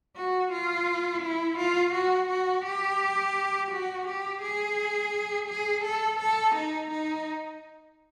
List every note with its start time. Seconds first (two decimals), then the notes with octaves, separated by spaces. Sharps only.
0.16 F#4
0.52 F4
1.23 E4
1.58 F4
1.94 F#4
2.29 F#4
2.65 G4
3.71 F#4
4.07 G4
4.42 G#4
5.48 G#4
5.84 A4
6.20 A4
6.56 D#4
6.91 D#4